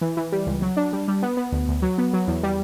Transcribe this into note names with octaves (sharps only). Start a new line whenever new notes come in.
E3
E3
G3
C#2
F#3
D4
G3
G3
B3
B3
D2
D2
F#3
B3
F#3
E2
G3